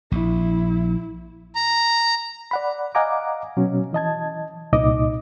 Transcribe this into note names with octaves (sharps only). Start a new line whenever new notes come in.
A#1 E4
A#5
D5 F#5 B5
D#5 F5 F#5 G#5 A#5 D6
B2 F#3 C#4
E3 D#5 A5 G#6
C2 A#2 D#4 D#5 D6